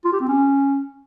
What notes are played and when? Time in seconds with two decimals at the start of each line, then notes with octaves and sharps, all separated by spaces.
0.05 F4
0.13 G4
0.21 C4
0.28 C#4